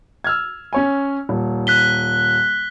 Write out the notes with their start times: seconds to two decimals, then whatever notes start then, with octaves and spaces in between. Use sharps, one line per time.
0.24 E6 F6 G#6
0.73 C#4 C#5 G#5
1.29 D#1
1.67 F#6 B6 G7